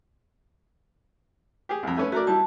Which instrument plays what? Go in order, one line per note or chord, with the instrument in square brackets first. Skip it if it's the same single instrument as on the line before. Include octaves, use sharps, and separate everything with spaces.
[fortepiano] G4 G#4
C2 F2
A3 C#4 B4
[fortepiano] A3 A#4 D5 [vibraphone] F#4
[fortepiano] G3 E4 [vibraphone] A5